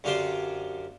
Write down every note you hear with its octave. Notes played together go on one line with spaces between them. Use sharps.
F#2 D3 F4 G4 C5 C6